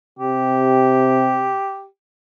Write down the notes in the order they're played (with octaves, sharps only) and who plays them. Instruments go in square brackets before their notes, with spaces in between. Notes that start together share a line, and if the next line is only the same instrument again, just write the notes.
[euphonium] C3 [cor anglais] G4